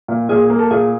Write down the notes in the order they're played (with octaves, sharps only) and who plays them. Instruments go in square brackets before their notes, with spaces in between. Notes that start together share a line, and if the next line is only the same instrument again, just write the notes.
[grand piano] A#2
[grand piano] A#2 [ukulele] G#4
[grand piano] A#3
[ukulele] A4
[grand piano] A#2 [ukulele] G#4